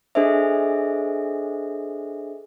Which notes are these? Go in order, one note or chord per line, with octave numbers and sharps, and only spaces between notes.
D4 G#4 A4 C5 D#5 E5